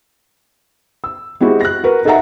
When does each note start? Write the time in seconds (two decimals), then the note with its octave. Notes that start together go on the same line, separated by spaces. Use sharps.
1.04 E6
1.40 G#3 C4 E4 F#4 G4
1.61 F#6 A#6
1.84 F#4 A#4 B4
2.05 D#4 A4 A#4 E5 F#5 A#5